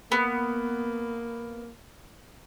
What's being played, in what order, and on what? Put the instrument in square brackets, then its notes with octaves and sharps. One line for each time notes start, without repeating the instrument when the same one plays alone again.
[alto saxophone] A#3 [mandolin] B3